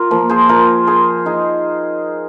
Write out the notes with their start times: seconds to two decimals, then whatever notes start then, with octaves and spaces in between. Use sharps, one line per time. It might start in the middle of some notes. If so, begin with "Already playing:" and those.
Already playing: F4 A#4
0.11 F3 A#3
0.29 G#4 C5
0.49 F4 A#4
0.87 G#4 C5
1.26 D#4 G#4